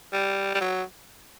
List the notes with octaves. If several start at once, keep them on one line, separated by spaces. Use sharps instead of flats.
G3
G3
F#3